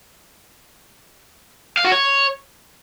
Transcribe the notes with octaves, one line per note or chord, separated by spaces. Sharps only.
F5
F#4
C#5